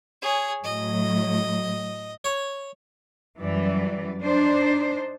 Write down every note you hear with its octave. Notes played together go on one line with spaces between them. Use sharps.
G#4 C#5
A2 F#3 D#5
C#5
F#2 E3 G3 D5
D4 D#4 C5